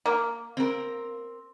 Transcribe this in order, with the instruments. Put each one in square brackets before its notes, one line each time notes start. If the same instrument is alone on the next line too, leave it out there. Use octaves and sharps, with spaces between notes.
[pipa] A#3
[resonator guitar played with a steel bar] C4 A#4